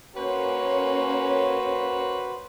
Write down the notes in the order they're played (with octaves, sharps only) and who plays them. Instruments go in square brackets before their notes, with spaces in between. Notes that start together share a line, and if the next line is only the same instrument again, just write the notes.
[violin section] A#3 C#4 [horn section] F#4 B4 C5